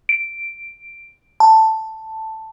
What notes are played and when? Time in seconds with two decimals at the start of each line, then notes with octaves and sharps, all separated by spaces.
0.09 D7
1.40 A5